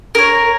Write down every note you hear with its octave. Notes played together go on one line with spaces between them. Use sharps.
A#4 C#5